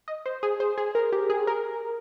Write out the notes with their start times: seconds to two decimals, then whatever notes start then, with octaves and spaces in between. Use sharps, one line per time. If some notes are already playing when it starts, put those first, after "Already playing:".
0.08 D#5
0.26 C5
0.43 G#4
0.60 C5
0.78 G#4
0.95 A#4
1.12 G4
1.30 G#4
1.47 A#4